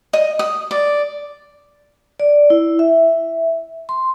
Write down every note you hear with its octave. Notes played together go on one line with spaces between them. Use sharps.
D#5
D#6
D5
D5
E4
E5
C6